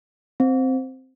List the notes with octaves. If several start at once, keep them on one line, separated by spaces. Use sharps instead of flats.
C4